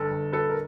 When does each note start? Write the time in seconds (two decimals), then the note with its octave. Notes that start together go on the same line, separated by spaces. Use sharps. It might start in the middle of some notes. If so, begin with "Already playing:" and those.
Already playing: G1 A4
0.11 G1
0.33 A4 B4
0.49 A#4